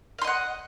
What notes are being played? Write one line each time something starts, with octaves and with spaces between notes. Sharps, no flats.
D#5 F5 F#5 C6